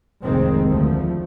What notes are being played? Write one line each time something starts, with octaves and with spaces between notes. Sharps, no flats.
F1 C2 F2 D#3 G#3 C4
D2 F3 A3